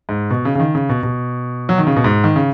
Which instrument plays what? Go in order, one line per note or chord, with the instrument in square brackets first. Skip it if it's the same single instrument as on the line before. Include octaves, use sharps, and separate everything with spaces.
[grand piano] G#2
B2
C#3
C#3
D#3
C#3
B2
B2
F#3
D#3
C#3
B2
G#2
D#3
C#3